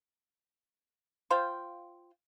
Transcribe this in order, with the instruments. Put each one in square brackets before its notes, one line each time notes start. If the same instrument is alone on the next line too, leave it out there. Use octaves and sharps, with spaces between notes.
[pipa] F4 C5 F5 G5